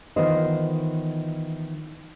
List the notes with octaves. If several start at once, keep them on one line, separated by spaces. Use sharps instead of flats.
D#3 E3 B3 F4 C5 D#5